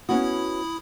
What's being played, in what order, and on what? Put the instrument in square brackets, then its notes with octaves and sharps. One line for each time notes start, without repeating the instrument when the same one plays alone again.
[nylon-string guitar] B3 C#4 F#4 [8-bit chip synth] E4 B5 D#6